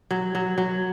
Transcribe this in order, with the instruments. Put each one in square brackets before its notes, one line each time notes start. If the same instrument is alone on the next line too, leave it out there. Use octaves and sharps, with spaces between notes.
[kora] F#3
F#3
F#3